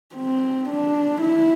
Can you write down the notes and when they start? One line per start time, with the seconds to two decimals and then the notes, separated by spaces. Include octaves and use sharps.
0.16 C4
0.69 D4
1.22 E4